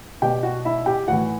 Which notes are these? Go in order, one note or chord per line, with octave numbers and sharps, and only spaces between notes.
B2 G4 G5
F#4 F#5
E4 E5
G4 G5
A2 E3 F#4 F#5